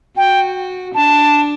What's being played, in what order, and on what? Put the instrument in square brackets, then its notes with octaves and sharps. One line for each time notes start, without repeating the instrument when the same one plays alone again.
[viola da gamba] F#4 [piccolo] G5
[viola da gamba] D4 [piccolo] A5